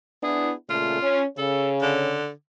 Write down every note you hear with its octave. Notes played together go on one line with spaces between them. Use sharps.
B3 D4 E4 G#4
A#2 C#3 A3 F4
C#4
C#3 A4 C#5
D3